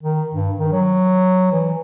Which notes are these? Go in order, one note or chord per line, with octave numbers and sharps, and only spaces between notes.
D#3
G2
D#3
F#3
E3